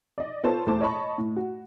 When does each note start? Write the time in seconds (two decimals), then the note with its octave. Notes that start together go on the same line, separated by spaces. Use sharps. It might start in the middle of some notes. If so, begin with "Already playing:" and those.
0.18 D5 D#5
0.43 B3 F4 A4 C5 C#5 A5
0.66 E2 A3 C5 A5 D6
0.81 C#5 D#5 A5 B5 C#6
1.18 A2
1.36 F#4